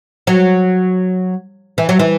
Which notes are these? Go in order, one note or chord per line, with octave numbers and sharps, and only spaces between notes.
F#3
E3
F#3
E3